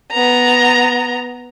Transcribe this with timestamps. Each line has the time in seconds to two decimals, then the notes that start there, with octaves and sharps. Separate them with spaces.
0.11 B3 A#5